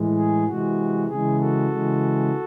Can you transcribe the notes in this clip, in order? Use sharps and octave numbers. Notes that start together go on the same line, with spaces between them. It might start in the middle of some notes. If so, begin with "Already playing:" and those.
Already playing: A2 E3 G#3
G#4
C3 E3 G#3 F#4
C#3 E3 G#3 G#4
F#4 A4
C#3 E3 G#3